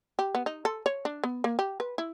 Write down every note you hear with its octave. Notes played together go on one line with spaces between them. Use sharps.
G4
B3
D#4
A4
C#5
D4
B3
A#3
G4
B4
E4